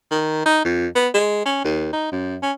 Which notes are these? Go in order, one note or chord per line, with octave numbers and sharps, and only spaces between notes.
D#3
D#4
F2
B3
G#3
C#4
D#2
D#4
F#2
C#4